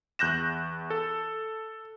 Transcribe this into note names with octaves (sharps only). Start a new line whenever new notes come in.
E2 F#6 G6 A#6 E7
A4